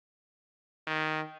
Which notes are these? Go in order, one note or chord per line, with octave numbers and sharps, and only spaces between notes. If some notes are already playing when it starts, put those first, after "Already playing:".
D#3